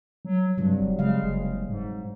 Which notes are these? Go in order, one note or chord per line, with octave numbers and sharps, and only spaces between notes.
F#3
G2 C3 F#3 G3
F1
C#3 F#3 G#3 F5
F#1
G#2